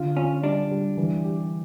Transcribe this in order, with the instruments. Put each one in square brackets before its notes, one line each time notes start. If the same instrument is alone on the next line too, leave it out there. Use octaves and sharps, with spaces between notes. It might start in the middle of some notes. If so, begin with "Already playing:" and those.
Already playing: [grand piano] D3 F4
[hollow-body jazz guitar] C#4 [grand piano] F4
[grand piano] G3 [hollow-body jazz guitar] D4
[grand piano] G3
E3
G4